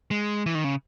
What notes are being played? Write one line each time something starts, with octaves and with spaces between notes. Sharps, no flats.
G#3
E3
D#3
C#3